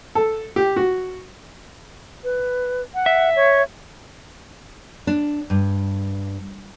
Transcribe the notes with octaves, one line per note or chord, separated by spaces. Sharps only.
A4
G4
F#4
B4
F#5
E5
C#5
D4
G2